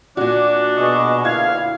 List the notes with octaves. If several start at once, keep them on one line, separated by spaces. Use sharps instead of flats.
A#2 D4 F#4 D5
B2 G#4 D#5 C#6
D2 A#2 E4 F5 G#6